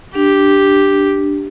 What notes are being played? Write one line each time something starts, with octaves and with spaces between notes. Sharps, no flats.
D4 G4